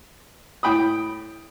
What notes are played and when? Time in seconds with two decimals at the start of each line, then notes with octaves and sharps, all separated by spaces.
0.63 A2 G5 B5 D#6